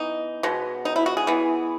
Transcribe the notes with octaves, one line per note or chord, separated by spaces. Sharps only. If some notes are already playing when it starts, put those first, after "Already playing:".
Already playing: E3 B3 D#4
B2 G#3 B3
D#4
E4
F#4
G#4
E3 B3